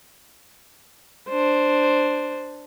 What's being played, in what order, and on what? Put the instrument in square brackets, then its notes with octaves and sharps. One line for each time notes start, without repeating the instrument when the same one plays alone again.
[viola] D4 C5